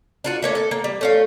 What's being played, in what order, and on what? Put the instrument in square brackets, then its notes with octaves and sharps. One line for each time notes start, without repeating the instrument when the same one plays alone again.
[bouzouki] D4 F4 F#4
A3 A#3 C#4
A4
A#3
G3
A3 C#4 F4